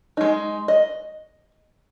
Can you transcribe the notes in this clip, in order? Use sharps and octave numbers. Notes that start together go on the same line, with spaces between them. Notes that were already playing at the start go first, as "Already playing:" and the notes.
G#3 D#4
D#5